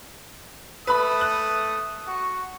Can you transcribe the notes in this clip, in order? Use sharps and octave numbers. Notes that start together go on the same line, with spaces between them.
A3 B4 B5 D#6
F#6
F#4 C#6